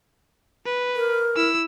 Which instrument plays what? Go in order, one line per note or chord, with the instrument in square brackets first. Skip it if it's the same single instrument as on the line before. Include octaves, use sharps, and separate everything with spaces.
[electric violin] B4
[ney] A#4
[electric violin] E4 E6